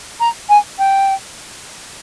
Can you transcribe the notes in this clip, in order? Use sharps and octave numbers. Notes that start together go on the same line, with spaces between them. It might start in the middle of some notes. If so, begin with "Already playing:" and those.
A#5
G#5
G5